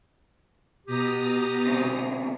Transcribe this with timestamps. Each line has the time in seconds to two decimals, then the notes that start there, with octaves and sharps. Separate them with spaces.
0.87 B2 G4 A#5 D#6
1.67 D2 C3